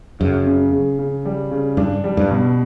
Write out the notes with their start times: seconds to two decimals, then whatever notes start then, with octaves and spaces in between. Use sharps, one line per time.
0.20 F#2 C#3
0.47 C#3
0.72 C#3
0.99 C#3
1.25 G3
1.51 C#3
1.77 G2 D4
2.04 G3
2.17 G2
2.31 B2